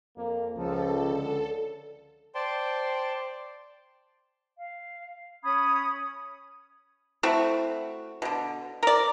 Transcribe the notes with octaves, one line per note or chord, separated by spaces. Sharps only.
F2 A#3
C#2 F3 A4
D3
C5 D5 G5 A5 C6
F5
C#4 B5 D#6 G#6
A3 C4 E4 F#4
B2 D3
A#4 D5